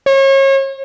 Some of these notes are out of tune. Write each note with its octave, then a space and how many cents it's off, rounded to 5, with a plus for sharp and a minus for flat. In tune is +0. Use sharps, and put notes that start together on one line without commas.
C#5 -35